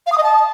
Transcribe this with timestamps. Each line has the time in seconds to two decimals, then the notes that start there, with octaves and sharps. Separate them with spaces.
0.07 F5
0.12 D#6
0.18 D#5
0.23 A5